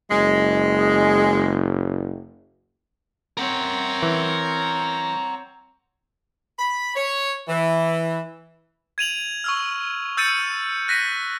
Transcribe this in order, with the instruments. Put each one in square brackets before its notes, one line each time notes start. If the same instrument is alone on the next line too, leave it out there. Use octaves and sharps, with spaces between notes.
[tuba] F#1 [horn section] G#3
[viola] C4 C#5 [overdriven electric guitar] A#4 F#5
[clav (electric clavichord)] E3
[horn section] B5
C#5
E3
[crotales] G#6 D#7 F7 F#7
C#6 E6 F6
E6 G6 A6 C#7 D#7
F#6 A#6 B6 D#7